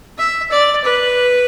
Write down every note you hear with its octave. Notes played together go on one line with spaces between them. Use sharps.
E5
D5
B4